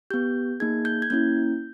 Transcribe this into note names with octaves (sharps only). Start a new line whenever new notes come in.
B3 G4 G6
A#3 D#4 G#4 G#6
G6
G#6
A#3 C#4 E4 G6